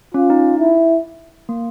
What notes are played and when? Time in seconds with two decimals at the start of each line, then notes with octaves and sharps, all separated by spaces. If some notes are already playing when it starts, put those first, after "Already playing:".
0.14 C#4 F4
0.30 D#4
0.59 E4
1.49 A#3